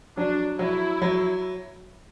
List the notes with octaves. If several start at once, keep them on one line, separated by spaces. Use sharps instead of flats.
F#3 D4
F#3 E4
F#3